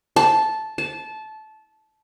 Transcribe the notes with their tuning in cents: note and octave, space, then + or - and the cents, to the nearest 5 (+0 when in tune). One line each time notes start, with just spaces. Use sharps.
A5 -10
A5 -20